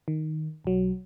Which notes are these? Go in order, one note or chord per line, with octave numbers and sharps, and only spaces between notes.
D#3
B1 F#3